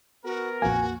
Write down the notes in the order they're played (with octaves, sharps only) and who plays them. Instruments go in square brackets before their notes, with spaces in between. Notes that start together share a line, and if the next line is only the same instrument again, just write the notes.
[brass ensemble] B3 A#4 [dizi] F#4
[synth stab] A#1 F2 A#3 [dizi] F#4 [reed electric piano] G#5